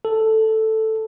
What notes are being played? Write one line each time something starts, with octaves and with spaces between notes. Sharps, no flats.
A4